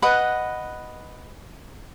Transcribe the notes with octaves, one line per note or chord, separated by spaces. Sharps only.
B4 D#5 F#5